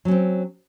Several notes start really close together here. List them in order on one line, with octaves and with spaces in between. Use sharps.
F#3 C#4 C4